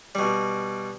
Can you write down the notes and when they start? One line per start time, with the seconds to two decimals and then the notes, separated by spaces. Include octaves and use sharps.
0.15 B2 G3